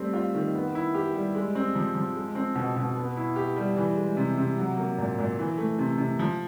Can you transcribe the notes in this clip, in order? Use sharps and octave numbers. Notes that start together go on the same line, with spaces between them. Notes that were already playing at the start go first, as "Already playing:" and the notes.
Already playing: G3 A3 C4
F4
D#3
B3
E4
G4
G3
G#3
C4
F3
F3
G#3
C4
B2
B2
B3
E4
G4
G3
E3
G#3
C3
C3
F#3
A#3
A#2
A#2
E3
A3
C3
C3
F3